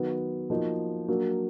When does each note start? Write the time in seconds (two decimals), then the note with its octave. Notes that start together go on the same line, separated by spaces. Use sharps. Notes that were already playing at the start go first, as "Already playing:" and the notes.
Already playing: D#3 F#3 B3
0.50 F3 A#3 D#4 F#4
1.08 F#3 A#3 D4